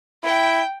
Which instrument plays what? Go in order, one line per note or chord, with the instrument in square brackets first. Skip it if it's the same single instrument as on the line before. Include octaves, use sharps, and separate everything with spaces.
[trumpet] E4 [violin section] G5